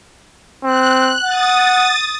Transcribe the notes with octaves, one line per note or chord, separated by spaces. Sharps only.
C4 F#6
F#5 D#6 A6